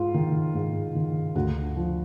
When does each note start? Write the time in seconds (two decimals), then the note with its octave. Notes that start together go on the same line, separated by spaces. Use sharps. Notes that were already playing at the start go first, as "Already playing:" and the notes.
Already playing: G#2 F4
0.14 D#3
0.54 G#2
0.95 D#3
1.35 D2 F#4
1.76 D3 F3